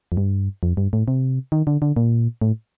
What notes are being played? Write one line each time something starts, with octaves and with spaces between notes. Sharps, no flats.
F2
G2
F2
G2
A2
C3
D#3
D3
D3
A#2
A2